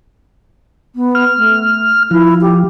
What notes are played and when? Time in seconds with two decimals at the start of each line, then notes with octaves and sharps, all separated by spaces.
0.95 B3
1.15 F6
1.37 A3
2.11 F3 E4
2.41 G4